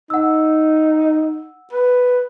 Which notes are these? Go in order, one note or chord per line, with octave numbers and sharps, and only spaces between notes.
D#4 F#5 E6
B4